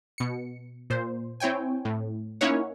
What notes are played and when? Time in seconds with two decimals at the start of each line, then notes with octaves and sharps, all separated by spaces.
0.18 B2 C#7
0.90 A#2 C5
1.40 C4 E4 C#5 G5 G#5
1.85 A2
2.41 A#3 C#4 D#4 E4 C#5 F#5